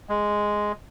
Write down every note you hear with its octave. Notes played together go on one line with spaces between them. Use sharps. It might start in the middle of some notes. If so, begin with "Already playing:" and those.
G#3